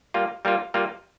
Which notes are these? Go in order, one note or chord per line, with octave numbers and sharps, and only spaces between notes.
G3 A#3 F4
G3 A#3 F4
G3 A#3 F4